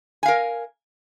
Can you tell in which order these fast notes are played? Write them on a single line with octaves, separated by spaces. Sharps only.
G#5 F5 A#4